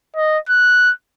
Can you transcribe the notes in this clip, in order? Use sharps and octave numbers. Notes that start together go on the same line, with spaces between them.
D#5
F#6